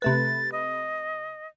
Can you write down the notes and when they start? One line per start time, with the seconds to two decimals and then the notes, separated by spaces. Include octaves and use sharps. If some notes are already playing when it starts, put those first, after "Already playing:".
0.02 C3 A3 B4 A6
0.52 D#5